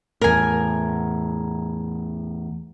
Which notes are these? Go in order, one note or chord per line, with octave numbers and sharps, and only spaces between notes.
E2 A2 A#4 G#5